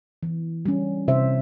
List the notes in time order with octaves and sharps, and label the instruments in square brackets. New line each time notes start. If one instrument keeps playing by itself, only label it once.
[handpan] E3
G3 C#4
C3 C5 E5